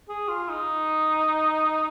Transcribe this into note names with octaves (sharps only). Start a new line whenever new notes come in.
G#4
F4
D#4